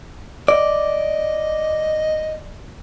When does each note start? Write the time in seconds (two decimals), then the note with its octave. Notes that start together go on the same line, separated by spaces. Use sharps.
0.48 D5 D#5